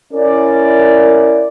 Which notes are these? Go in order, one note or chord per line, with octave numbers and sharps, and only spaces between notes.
C#4 E4 A#4 D5